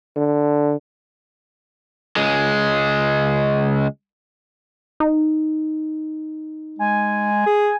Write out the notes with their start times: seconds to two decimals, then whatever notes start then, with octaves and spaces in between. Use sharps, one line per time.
0.16 D3
2.17 C#2 G#3
5.00 D#4
6.79 G#3 G#5
7.46 G#4